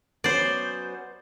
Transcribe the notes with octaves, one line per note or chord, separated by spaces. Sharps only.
F#3 B3 C#4 C5 D5